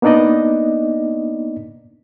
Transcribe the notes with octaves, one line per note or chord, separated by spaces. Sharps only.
A#3 B3 D4 D#4 D5 D#5